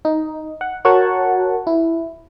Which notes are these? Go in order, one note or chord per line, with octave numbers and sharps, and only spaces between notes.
D#4
F#5
F#4 A#4 C#5 F#5 A5 C#6
E4